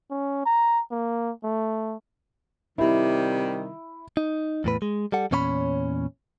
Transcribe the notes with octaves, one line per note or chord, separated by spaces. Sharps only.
C#4
A#5
A#3
A3
C3 D#3 G3 E4
D#4
E2 A2 B4
G#3
G3 A4 F#5
E2 A#2 C#4 C#5 A5 B5